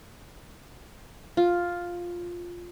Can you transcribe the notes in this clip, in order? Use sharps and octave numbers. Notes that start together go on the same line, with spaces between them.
F4